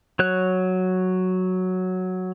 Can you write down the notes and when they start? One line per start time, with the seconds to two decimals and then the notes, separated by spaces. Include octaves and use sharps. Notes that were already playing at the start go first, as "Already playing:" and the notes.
0.19 F#3 C#5 F#6